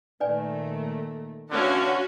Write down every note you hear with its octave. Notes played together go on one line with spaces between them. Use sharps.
A#2 D#3 A3 B4 D5 G#5
A1 D3 C#4 F#4 F5 F#5 A5